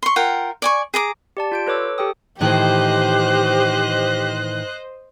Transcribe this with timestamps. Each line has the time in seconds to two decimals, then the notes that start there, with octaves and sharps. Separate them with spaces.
0.03 C6 C#6
0.16 F4 A#4 F#5 G5
0.62 D5 G#5 C#6
0.94 G#4 A#5 D6
1.37 G4 D5 A5
1.52 F4 G6 D7
1.66 A4 B4 C#5 D6 E6
1.98 G4 A4 G5 D#6
2.41 A2 D#3 E3 G4 C5 D#5 F#6